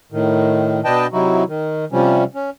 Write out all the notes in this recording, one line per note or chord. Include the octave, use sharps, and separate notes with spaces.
A2 D#3
B2 D4 B4 D#5 G5 A5
C3 F#3 D#4 E4 F#4
D#3
C3 F3 G3 C#4
C#4